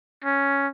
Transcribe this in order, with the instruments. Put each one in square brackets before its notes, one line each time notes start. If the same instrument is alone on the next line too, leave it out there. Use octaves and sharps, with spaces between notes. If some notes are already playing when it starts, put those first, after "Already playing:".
[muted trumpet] C#4